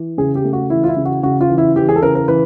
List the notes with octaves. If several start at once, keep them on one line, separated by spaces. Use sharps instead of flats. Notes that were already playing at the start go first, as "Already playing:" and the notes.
Already playing: E3
C#3 G#4
G4
A3
F#4
E3 E4
F4
E4
C#3
F#4
C#3 F#4
F4
E3
E4
E3 G4
G#4
A4
C#3 A#4
A#4
E3 B4